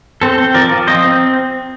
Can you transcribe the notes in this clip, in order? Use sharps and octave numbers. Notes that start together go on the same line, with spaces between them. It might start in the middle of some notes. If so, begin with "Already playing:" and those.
C4 A4 C5
C4
F3 A#4 D5
F3
C4 C5 D#5
C4